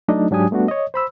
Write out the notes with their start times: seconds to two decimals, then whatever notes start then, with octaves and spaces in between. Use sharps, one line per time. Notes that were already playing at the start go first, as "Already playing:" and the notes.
0.08 F#3 A3 D4 D#4 D#5
0.31 G#2 F#3 D4 G4 G#5 D#6
0.51 G3 A3 B3 D4 F#4
0.68 C#5 D#5
0.94 C5 B5 E6